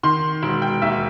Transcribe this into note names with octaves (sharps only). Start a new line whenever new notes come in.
D#3 C6
E1
G5
D#2 E5